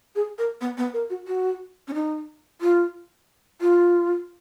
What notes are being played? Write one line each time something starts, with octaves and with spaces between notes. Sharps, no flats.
G#4
A#4
B3
B3
A#4
F#4
F#4
C#4
D#4
F4
F4